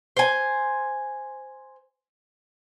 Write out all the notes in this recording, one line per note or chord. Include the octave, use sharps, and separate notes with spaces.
C5 G#5